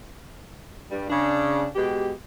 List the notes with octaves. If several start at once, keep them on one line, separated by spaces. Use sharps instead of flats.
G2 G3
C#3 D4
B2 G#3 G4